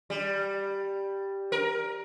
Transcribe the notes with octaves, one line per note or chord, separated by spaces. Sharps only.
G3
A#4